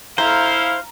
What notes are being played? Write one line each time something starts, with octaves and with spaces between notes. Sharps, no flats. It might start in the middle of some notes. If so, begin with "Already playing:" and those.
E4 C5 F5 A#5